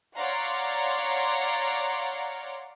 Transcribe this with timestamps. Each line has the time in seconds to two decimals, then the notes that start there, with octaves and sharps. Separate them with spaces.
0.16 C#5 D5 F5 F#5 A#5 C6